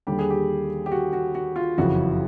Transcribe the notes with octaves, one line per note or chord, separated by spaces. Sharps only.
D#2 D3 G3 G4
G#4
G4
G4
F#4
F#4
F#4
F4
F#1 F2 C#3 E3 F#4